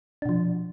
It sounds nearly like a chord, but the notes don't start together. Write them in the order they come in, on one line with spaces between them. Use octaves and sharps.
D4 B2 F3